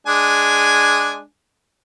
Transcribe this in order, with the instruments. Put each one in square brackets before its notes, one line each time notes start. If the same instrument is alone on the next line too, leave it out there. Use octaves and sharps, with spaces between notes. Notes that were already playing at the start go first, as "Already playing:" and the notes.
[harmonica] G#3 D4 G#5